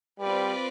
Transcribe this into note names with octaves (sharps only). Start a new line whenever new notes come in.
G3 C4 F4 B4 D5